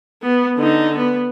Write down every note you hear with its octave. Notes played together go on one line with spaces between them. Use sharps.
B3
D3 D#4
B3